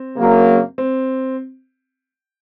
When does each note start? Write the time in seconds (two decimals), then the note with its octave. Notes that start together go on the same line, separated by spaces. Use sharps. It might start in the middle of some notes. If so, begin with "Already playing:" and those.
Already playing: C4
0.16 F#2 C#3 F#3 A#3
0.78 C4